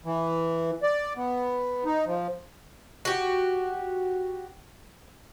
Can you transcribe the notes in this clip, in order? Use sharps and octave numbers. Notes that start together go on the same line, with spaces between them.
E3
D5
B3
D#4
F3
F#4 G4